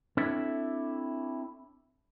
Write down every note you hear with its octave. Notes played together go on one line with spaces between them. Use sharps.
C4 D4 E4 A4 C#5 E5